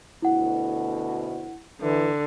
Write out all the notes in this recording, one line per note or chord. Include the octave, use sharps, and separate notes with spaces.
D2 B2 E4 F#5
D3 E3